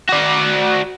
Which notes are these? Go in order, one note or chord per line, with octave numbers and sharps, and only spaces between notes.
F#4 D5